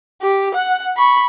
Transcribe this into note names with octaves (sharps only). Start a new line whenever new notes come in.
G4
F#5
B5 C#6